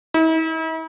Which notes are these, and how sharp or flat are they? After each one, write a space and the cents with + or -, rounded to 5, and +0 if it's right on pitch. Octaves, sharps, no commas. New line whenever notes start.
E4 -45